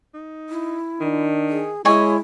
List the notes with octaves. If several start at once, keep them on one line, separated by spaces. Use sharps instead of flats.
D#4
E4
D#3 D4
G#4
G#3 E4 G#4 C#5 D#5 G#5